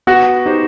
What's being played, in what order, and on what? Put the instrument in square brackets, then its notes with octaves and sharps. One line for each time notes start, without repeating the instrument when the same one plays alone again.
[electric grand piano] B3 [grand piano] F#4
[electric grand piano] D#4 G4 C5